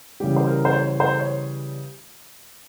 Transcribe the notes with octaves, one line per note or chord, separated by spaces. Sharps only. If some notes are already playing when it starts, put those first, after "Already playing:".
C#3 E3 G3 G4
C5
A#4
C5
C#5
C5
C#5